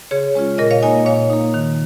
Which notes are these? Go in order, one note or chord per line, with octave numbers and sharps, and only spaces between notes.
C#3 G#4 C#5
G#3 C#4 F4
A#2 A#4 D#5
C#5 F5
A#3 D#4 D#5 G#5
A#2 C#5 F5
A#3 D#4
D#3